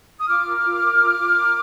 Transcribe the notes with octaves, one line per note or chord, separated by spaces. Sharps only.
D#6
F4 D6 F6
A#4
F4
A#4
F4
F4
A#4